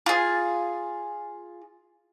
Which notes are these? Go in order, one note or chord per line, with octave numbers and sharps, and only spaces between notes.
F4 G#4